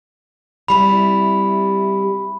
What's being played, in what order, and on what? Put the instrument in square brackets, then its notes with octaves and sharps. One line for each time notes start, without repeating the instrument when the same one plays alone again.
[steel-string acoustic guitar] C3 G3 E4 [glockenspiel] B5